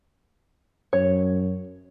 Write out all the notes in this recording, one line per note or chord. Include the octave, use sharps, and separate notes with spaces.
F#2 C#5